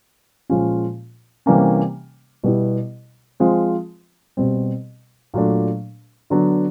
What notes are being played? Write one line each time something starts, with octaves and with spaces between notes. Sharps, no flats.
A#2 F3 G#3 C#4 F4
C3 E3 G3 A#3 C#4
B2 G3 B3 E4
F3 G#3 C4 F4
B2 G3 C4
A#2 F#3 A3 D4
D3 F#3 B3 D4